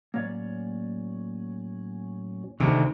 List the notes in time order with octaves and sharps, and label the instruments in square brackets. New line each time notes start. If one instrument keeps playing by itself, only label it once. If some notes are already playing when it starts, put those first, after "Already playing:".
[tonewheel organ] A2 F#3 C#4 [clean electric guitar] A#3 C#5 D5
[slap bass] D2 C3 [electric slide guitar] D#3 [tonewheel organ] D#4 G#4